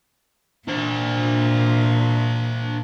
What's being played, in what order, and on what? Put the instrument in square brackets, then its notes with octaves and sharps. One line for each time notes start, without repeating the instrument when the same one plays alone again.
[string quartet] A#2 [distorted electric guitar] D4 C5